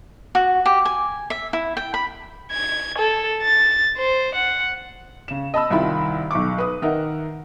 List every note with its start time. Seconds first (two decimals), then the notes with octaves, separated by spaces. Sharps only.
0.35 F#4
0.66 G4
0.85 G#5
1.30 E5
1.53 E4
1.77 G5
1.94 B5
2.52 G#6
2.99 A4
3.42 A6
3.97 C5
4.35 F#5
5.28 C#3 E7
5.54 D#5 A5 B5 E6
5.71 C2 D#3 E4 F4 B5
6.31 B1 C#6 D6
6.58 B4 D#6
6.82 D#3 D#4 A#4 E5 F#5